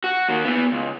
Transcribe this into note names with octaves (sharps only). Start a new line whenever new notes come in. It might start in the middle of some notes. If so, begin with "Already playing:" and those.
F#4
D#3 A#3
B3 E4
C#2